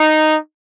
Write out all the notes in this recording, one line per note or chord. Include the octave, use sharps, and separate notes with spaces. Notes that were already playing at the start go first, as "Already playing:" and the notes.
Already playing: D#4